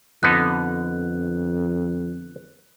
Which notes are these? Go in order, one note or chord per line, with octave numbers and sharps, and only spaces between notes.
F2 D3 B3 D#4 F#6